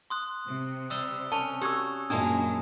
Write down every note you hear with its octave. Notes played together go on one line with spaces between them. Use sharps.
C6 D#6 F#6
C3
G3 D#6 E6 G7
C#4 A5 F7 G7
F#4 G4 D#6 E6 G#6
F#2 A#2 G#3 A#3 D4 G#5 A5 D#6